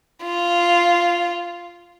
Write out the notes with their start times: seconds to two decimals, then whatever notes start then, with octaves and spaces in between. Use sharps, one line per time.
0.23 F4